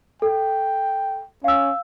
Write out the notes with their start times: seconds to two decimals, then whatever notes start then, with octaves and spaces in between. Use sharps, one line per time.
0.22 A4 G5
1.44 C#4 F5 E6